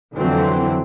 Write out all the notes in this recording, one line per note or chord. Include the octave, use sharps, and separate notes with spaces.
F2 D3 E3 F#3 C4